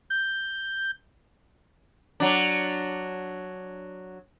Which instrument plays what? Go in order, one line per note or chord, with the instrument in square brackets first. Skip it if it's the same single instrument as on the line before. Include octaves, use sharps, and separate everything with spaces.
[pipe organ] G6
[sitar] F#3 D4